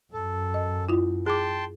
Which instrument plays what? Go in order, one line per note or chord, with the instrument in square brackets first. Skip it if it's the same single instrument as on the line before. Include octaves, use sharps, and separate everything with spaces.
[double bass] F#2 [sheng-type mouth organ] A4
[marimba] D#5
E4 F4
[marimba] G#4 D6 [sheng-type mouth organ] G5 A5 C6